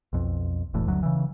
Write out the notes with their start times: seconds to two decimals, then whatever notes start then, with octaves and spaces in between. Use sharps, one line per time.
0.13 B1 F2
0.74 E1 E2 A2
0.87 G1 D2 F#3
1.03 C#3 E3